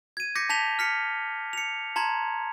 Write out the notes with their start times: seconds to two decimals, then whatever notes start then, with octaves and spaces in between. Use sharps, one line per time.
0.17 G#6 D#7
0.35 D6 G6 A#6 B6 C#7
0.49 A5 G6 B6 F7 G7
0.79 F6 B6 C#7
1.53 C#7 F7
1.96 A5 A#5 C6 G#6